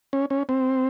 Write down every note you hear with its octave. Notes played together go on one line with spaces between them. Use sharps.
C#4
C#4
C4